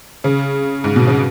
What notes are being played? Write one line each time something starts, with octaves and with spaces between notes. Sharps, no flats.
C#3
G#2
B2
C#3